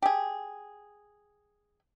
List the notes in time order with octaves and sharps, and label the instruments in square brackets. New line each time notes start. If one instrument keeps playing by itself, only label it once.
[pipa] G4 G#4